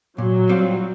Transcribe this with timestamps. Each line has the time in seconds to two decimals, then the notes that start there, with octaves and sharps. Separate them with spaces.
0.18 A#2 F#3
0.49 G3 C4 F4